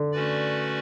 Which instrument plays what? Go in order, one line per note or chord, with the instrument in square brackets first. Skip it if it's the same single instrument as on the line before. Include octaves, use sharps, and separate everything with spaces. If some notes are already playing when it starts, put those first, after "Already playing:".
Already playing: [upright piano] D3
[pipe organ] A3 C#4 F#4 B4 D5